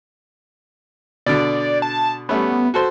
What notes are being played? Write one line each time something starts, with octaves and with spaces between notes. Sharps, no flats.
B2 D3 D5
A5
G3 A3 B3 C#4
F#4 A4 C5